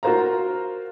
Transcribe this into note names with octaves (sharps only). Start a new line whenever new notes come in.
F4 F#4 A#4 C5 F5 A#5